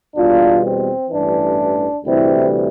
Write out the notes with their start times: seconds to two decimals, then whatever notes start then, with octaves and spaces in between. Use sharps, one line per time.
0.16 E2 B2 G3 D4 F4
0.63 C4
1.10 A1 G2 E3 D4
2.05 D2 C3 E3 G3 C4 E4